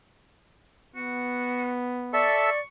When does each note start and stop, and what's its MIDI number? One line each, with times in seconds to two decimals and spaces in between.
0.96 2.30 59
0.96 1.74 66
2.13 2.50 69
2.13 2.60 74
2.13 2.50 76
2.13 2.63 85